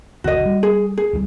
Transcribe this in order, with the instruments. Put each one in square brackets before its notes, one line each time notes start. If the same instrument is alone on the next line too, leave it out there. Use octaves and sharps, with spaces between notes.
[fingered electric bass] F#1 D2 [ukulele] F#4 D#5
[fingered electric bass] G3
[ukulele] G#4
G#4
[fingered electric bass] C#2 F#3 G3